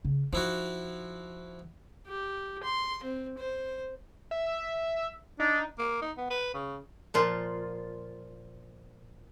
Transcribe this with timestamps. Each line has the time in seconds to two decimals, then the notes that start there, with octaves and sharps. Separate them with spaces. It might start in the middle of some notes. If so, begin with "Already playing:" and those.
0.05 C#3
0.33 F3 D#4 E4 F#4
2.07 G4
2.63 C6
3.03 C4
3.38 C5
4.31 E5
5.40 D4 D#4
5.78 A#3
6.02 D#4
6.17 B3
6.30 B4
6.54 C#3
7.14 A#2 F3 F4